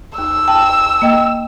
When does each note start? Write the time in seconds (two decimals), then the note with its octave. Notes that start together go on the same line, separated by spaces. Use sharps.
0.18 D#2 E6
0.48 G5 A5
1.02 A#3 D#5 G5